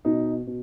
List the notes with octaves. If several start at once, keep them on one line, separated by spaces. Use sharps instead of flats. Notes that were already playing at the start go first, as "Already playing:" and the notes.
B2 D#4
B2